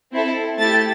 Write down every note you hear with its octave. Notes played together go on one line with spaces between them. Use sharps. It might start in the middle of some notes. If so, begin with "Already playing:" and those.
C4 E4 A4
A3 E4 G4 A6